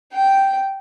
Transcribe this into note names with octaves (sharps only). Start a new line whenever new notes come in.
G5